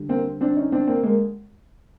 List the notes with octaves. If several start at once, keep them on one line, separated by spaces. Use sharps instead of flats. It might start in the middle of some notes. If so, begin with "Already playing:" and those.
Already playing: D3 G3
A#3 C4
C4 D4
C#4 D#4
C4 D4
A#3 C4
G#3 A#3